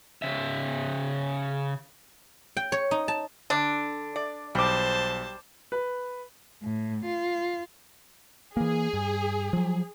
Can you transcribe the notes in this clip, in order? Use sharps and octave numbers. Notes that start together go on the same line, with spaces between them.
C#3 E5
G5
C#5
D#4
A5
D3 D4
D5
B1 G3 C5 A5 D6
B4
A2
F4
E3 A#3 G#4
G2
F3 F#3